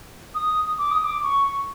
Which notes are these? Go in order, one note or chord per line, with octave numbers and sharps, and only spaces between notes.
D#6
D6
D#6
D6
C#6